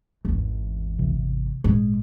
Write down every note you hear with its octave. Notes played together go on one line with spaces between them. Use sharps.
G#1 E2
C#2 C3 E3
C3
G#1 A#2 G#3